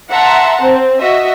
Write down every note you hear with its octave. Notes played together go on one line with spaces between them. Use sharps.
E5 F#5 A5 A#5 C6
C4
F#4 D#5 E5